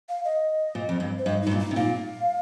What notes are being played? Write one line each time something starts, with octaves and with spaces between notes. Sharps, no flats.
F5
D#5
A#2
F2
G2
C5
G2 D#5
G2 D#4
A#2
D#4
C3
A#2 F5